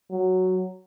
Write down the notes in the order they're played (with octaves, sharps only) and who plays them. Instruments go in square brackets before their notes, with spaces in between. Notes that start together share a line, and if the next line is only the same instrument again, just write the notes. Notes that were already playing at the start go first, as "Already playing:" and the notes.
[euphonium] F#3